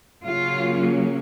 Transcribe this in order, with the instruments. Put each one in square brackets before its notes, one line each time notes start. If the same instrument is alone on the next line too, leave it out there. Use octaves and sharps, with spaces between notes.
[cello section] C#3 F#3 A#3 C#4 F4